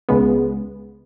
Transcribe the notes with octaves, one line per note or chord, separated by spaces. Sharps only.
C#2 C#3 G#3 B3